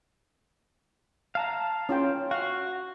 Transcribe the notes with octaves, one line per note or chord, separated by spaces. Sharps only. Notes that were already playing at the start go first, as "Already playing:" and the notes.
F5 A5 A#5
C#4 F4 G5
F#4 F5